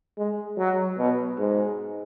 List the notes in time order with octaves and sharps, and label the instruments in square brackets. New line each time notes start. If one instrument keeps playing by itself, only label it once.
[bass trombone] G#3
F#3
B2
G#2